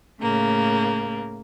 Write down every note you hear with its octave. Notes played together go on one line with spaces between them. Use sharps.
A2 C#3 A#3